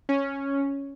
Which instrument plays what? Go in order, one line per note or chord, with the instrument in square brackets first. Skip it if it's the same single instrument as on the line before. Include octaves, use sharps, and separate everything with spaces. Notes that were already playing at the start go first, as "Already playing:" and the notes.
[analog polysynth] C#4